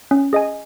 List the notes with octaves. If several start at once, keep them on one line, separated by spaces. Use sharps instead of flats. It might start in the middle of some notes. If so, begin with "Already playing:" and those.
C#4
G#4 D#5 G#5